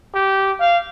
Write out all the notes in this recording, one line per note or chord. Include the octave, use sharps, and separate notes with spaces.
G4
F5